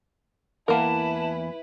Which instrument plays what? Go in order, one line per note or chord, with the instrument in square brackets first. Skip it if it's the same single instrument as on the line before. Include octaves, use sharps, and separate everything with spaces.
[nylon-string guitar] E2 E3 F#5 [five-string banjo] A#3 A#4 [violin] E4 B4 [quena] A5